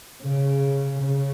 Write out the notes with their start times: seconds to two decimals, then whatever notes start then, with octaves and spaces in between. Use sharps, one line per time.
0.22 C#3
1.01 C#3